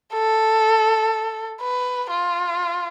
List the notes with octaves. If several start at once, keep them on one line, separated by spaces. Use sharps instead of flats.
A4
B4
F4